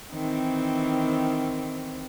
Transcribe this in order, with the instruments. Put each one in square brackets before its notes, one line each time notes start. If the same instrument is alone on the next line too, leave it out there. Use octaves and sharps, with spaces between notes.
[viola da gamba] D#3 E3 C4